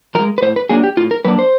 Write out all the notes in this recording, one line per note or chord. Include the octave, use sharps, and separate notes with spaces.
F3 A#4
G#3
B4
A2 C5
B4
F#3 A#3 D4 G#4
G4
A2 F4
A#4
F#3 A#3 D4 B4
C5